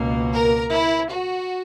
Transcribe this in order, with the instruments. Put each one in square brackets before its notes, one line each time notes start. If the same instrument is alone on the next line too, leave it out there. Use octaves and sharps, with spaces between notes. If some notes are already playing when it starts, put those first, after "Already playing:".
Already playing: [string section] C#2 B2 A#3
A#4
E4
F#4